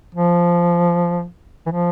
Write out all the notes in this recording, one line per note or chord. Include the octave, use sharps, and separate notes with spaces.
F3
E3
F3